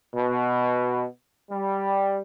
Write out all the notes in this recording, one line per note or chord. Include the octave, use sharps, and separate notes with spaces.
B2
G3